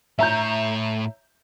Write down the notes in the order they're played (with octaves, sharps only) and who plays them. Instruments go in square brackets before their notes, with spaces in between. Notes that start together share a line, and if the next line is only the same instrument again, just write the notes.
[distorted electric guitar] A2 C#5 [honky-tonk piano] E5 A#5 G6